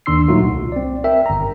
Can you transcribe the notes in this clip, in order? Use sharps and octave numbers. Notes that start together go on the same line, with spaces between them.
D#2 D#3 D4 C6 E6 C7
A#2 F#3 A3 D#4 F4 F#4
C2
C4 D5
A#4 E5 G5
G1 A#5